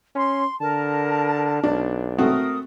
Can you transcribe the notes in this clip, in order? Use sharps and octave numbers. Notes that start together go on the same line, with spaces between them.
C#4 C6
D3 A#4 A5
B1 D4
A3 C4 F#4 A#4 D#6